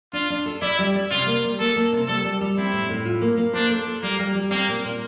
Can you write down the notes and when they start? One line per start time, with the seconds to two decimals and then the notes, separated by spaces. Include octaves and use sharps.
0.13 D4 F4
0.30 D4
0.46 A4
0.62 E4 D5
0.79 G3
0.95 D5
1.11 C3 F4
1.27 A#3
1.44 G3
1.59 A#3 A4
1.76 A#3
1.92 C3
2.08 G3 A4
2.24 G3
2.41 G3
2.57 C4 E4
2.73 A2
2.90 A2
3.05 F4
3.21 A#3
3.37 A#3
3.53 D4 C5
3.70 A4
3.87 A4
4.02 G3 A#3
4.19 G3
4.35 G3
4.51 A#3 C4
4.68 A#2
4.84 A#2